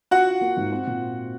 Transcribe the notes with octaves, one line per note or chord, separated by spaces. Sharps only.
F4 F#4 F#5
F4
A#3
G#2
C4
A#2